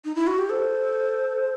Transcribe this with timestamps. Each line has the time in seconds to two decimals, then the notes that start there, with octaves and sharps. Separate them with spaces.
0.05 D#4
0.15 E4
0.27 F#4
0.38 G4
0.50 A4 C5